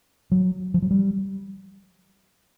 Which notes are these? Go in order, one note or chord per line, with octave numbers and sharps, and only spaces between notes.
F#3
F3
F#3
G3